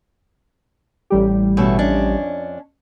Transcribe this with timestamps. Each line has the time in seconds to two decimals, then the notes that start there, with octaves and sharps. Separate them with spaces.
1.10 A1 G3 G4
1.57 B2 A3 C#4
1.79 F2 C#4 D4